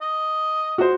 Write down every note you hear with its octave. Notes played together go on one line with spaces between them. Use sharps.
D#5
F#4 C5